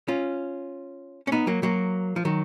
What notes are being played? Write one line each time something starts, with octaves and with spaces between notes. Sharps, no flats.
C#4 F4
C#4
B3 D#4
F#3 A#3
F#3 A#3
F3
D#3 F#3